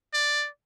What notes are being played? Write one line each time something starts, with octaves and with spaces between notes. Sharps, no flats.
D5